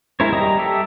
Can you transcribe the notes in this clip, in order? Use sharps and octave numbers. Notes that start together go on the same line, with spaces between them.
G#3 E4 A#4 C5 C#5
G3 G4 D#5 A#5 D#6
G4 A4 E5